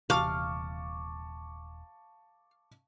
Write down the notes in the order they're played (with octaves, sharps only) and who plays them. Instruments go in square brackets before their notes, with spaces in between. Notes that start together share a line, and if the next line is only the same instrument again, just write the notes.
[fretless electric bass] D#1 C3 E3 [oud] F5 [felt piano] A5 C#6 D6